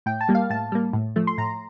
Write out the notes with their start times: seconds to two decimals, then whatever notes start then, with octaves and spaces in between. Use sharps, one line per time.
0.06 A2 G5
0.21 A5
0.29 G3 A#3
0.35 F5
0.50 A2 A5
0.72 G3 A#3
0.93 A2
1.16 F3 A3
1.27 C6
1.38 A2 A#5